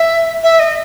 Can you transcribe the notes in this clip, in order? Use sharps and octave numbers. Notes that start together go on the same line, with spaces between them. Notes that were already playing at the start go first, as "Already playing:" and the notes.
Already playing: E5
E5
D#5